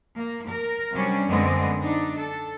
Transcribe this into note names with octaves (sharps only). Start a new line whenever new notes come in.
A#3
A#4
C3 F#3 G3 C#4 D4
F#2 D3 G#3 B3 C4 D#5
D4 D#4
A4